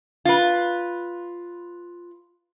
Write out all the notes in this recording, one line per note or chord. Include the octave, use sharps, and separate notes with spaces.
F4 B4